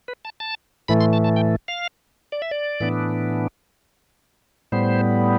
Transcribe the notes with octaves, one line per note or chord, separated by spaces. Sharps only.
B4
A5
A5
A2 E3 A3 B5
C6
A5
A5
G5
F5
D5
E5
D5
A2 E3 B3 D4
A2 G3 B3 C5